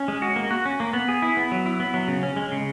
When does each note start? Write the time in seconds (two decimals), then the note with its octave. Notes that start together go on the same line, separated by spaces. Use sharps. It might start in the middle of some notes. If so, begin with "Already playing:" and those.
Already playing: C#4
0.08 G#3
0.22 F#4
0.36 A#3
0.51 F#4
0.65 C#4
0.80 A#3
0.93 B3
1.08 G#4
1.22 E4
1.37 B3
1.52 F#3
1.66 E4
1.80 B3
1.94 F#3
2.08 C#3
2.23 C#4
2.36 G#3
2.52 C#3